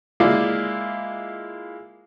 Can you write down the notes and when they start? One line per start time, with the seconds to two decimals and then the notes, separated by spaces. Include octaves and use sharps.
0.20 G#3 A#3 E4 F4 D5 F5